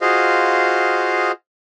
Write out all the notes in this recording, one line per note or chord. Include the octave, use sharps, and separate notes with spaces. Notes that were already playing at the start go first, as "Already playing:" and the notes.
F4 F#4 G#4 C5 D#5 F5